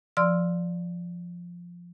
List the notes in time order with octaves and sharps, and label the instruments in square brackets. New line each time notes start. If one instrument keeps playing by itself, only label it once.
[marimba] F3 D5 C6 E6 F6